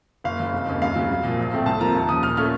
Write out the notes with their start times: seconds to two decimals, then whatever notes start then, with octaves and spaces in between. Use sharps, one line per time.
0.24 F#1 F5
0.39 F#2 C#3
0.53 F1
0.67 D#2 C#3
0.82 F#2 F5
0.95 C#3 F#3
1.09 C2
1.24 A#2 F3
1.38 A#1
1.52 A2 A3 C4
1.66 C2 A5
1.80 C3 F3 A#3 F4 A#5
1.95 D#2
2.09 C#3 F3 D#6
2.22 A#2 F6
2.37 A3 C#4 F4 F6